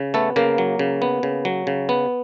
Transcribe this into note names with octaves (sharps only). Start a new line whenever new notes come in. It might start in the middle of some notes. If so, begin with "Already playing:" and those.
Already playing: C#3
A3 B3 A4
C#3 A#3 A#4
F#3
C#3
B3
C#3
F#3
C#3
B3